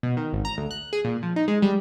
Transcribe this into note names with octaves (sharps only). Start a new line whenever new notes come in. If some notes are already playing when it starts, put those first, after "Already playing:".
B2
D#3
G#1
A#5
D2
F#6
G#4
A#2
F3
D#4
G#3
G3